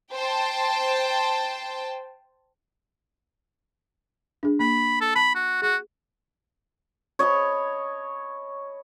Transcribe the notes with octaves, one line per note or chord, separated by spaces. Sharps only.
C5 G5 A5
D4 G#4
A#3 B5
A4
A5 B5
F#4
F#4 G#4
C#5 D#5 A5 B5